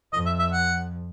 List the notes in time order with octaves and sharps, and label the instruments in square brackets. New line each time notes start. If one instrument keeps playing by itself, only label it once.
[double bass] F2 [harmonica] D#5
[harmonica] E5
E5
F#5